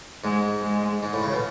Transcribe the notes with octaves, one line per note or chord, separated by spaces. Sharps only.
G#2 G#3
G#3
G#2
A2
C#3
B2